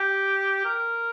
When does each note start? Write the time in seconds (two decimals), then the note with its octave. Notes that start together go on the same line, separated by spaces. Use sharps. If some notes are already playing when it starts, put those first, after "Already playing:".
Already playing: G4
0.65 A#4